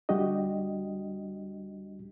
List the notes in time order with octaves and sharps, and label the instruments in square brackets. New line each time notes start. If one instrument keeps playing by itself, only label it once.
[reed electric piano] D2 G3 D4 F#4 G4 D#5